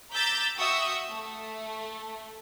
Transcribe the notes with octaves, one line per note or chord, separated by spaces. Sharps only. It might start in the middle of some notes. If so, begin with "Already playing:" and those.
A#5 D6 E6 G6 A6 B6
F#4 E5 G5 C#6 D#6 E6
A3